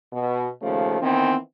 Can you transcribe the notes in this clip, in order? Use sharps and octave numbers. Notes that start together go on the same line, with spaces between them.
B2
D#2 C#3 F3 A3
D#3 E3 B3 C4